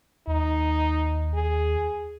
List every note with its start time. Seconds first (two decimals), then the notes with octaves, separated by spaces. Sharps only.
0.27 D#2 D#4
1.34 G#4